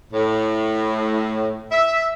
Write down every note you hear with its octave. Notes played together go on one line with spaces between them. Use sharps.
A2
E5